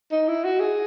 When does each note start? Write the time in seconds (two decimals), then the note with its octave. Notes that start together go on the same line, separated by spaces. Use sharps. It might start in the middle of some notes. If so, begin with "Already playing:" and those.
0.12 D#4
0.28 E4
0.44 F#4
0.60 G#4